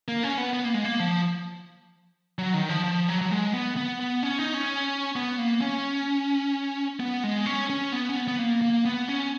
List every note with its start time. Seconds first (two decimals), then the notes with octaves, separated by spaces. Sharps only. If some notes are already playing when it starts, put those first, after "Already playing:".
0.08 A#3
0.23 C#4
0.38 B3
0.53 B3
0.64 A#3
0.74 G#3
0.84 A#3
1.00 F3
2.38 F#3
2.54 D#3
2.69 F3
2.84 F3
3.08 F#3
3.21 F#3
3.31 G#3
3.53 B3
3.76 B3
4.00 B3
4.23 C#4
4.39 D#4
4.54 C#4
5.16 B3
5.38 A#3
5.61 C#4
7.00 B3
7.24 G#3
7.46 C#4
7.70 C#4
7.92 B3
8.09 C#4
8.16 B3
8.28 B3
8.39 A#3
8.62 A#3
8.85 B3
9.08 C#4